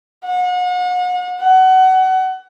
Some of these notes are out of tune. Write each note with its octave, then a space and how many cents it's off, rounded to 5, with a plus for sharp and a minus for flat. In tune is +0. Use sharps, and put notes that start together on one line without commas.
F#5 -40
F#5 +25